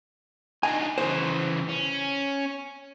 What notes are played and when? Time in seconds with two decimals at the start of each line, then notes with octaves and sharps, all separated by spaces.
0.63 D4 D#4 G#5
0.98 C#3 E3 C5
1.69 C#4